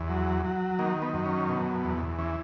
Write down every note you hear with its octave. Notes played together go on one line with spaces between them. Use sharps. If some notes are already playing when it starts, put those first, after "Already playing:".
Already playing: E2
F#3
F#3
D#3 A#3
B3
F#2
C#4
B2
E2
E3 C#4